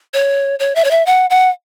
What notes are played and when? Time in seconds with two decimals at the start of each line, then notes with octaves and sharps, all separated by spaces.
0.14 C#5
0.59 C#5
0.75 E5
0.84 C#5
0.91 E5
1.06 F#5
1.30 F#5